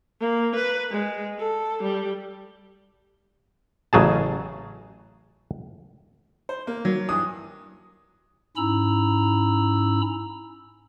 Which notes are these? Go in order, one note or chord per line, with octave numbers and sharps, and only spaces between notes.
A#3
B4
G#3
A4
G3
A1 C#3 F#3 G#4 A5
C5
A#3
F#3
G2 E3 D#6
G#2 C#4 E4 A#5 B5 E6